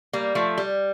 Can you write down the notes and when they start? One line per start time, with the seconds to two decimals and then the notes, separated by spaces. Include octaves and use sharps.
0.13 G3 A#3
0.35 F3 A3
0.58 G3